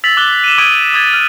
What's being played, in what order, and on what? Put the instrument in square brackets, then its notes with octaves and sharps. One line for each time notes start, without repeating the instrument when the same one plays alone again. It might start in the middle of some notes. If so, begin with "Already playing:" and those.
[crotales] E6 A6 B6 F7 F#7
D6 F#6 G7
D#7 E7
D6 D#6 G#6 D7 D#7
D#6 G#6 A6
F6